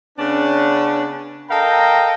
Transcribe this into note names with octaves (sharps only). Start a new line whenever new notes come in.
C#3 B3 C#4 D4
A4 A#4 D#5 F5 G5 A#5